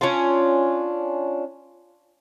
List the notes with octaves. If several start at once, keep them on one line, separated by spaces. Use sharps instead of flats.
C#4 D4 F4